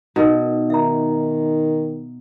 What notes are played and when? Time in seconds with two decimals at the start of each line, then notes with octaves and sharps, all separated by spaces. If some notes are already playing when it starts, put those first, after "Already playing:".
0.16 B2 D#4 A#4
0.70 D#3 E5 A#5